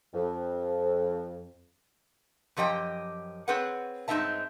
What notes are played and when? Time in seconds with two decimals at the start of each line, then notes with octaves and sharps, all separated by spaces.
0.14 F2
2.56 F#2 F3 G4 D#5 G5
3.48 C4 G#4 B4 C#5 F#5
4.08 G2 G#3 C4 D#4 E5 A5